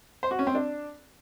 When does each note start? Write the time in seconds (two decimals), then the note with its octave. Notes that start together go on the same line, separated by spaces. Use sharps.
0.23 C5
0.31 F#4
0.39 C#4
0.47 C4
0.55 D4